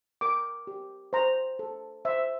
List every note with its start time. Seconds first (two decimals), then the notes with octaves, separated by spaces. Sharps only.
0.21 A#4 D6
0.67 G4
1.13 C5 A#5
1.59 A4
2.05 C5 E5